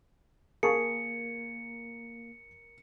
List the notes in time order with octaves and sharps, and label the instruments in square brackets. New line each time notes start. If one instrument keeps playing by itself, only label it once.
[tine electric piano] A#3 [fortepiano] G#4 A5 C#6 [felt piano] A#4 [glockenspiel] C#7